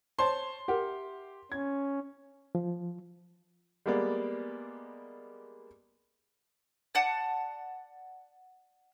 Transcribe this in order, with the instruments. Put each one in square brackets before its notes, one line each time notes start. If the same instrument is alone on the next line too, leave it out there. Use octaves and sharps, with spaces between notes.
[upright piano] C5 C#5 A5 [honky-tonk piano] C6
[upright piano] G4 [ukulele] A#4 E5 F#5
[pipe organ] C#4 [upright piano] G#6
[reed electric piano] F3
[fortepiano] G3 G#3 A#3 B3 D5
[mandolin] D5 F#5 A5